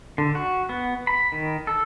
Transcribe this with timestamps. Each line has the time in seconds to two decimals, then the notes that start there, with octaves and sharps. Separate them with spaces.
0.18 D3
0.35 F#4
0.69 B3
1.07 B5
1.32 D#3
1.67 A4